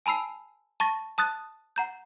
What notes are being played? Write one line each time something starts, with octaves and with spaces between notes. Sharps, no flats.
G#5 A5 B5 E6 C7
A5 C#6 A6 A#6
A5 D#6 F#6 A6
F#5 A#5 G6